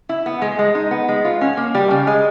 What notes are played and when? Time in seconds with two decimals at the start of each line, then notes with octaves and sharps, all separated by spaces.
0.09 E4
0.26 B3
0.42 G#3
0.59 G#3
0.75 D#4
0.91 B3
1.09 G#3
1.25 F4
1.41 C#4
1.57 A#3
1.75 G3
1.91 C#3
2.07 G#3